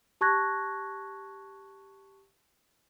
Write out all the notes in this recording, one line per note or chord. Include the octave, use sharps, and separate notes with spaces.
G4 A5 C#6 F#6 G#6 A#6